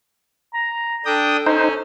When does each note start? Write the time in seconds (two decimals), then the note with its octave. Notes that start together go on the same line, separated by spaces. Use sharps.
0.54 A#5
1.06 D4 A4 G5 D#6
1.46 C#4 D#4 C5